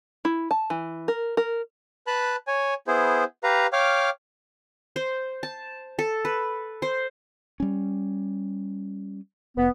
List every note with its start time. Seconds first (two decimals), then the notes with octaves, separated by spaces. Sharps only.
0.25 E4
0.51 A5
0.70 E3
1.08 A#4
1.37 A#4
2.07 B4 A5 B5 F#6
2.47 C#5 G#5
2.87 B3 E4 G#4 C5
3.44 G4 B4 F5 A#5
3.73 C#5 F5 G5 D6 F6
4.96 C5
5.43 A5
5.99 A4
6.25 B4
6.82 C5
7.60 G3 C#4
9.57 F1 B3